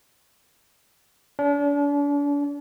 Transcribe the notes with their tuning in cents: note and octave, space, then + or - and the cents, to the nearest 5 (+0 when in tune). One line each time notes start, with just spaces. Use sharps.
D4 -40